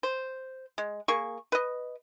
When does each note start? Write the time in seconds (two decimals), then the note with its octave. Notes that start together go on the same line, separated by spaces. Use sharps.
0.03 C5
0.78 G#3
1.08 A#3 G#4 A#4 C#6
1.52 B4 D#5